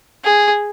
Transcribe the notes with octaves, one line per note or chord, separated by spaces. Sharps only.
G#4